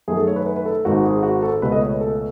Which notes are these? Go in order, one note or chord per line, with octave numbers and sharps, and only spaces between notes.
F#2 D#3 A3 G#4
A4
C#5
B4
B4
B4
A4
G#1 G#2 D#3 F#4
G#4
F#4
A4
C#2 B2 A3 B4
D#5
C#5
A4